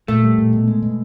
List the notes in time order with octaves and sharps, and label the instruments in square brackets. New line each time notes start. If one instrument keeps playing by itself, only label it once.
[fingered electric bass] A#2 [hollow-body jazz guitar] A3
[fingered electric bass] G3
A#2
B2
G#3
B2